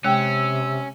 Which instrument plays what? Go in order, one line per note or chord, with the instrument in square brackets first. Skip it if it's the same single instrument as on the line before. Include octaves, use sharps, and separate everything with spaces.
[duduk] C3 [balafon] G#3 G5 [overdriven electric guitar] C#4 [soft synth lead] E6